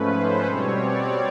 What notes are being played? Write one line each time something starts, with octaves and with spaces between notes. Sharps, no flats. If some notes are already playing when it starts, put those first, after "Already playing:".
Already playing: G#2 F3 A3 C#4 B4
C5
B2 G3 C4 C#5
D5